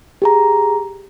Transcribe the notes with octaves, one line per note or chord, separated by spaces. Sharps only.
G4 G#4 A#5